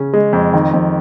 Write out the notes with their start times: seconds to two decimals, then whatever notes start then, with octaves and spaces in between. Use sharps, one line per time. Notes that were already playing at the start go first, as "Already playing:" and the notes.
Already playing: C#3 C#4
0.14 G#3
0.33 F2
0.54 D#3
0.74 F2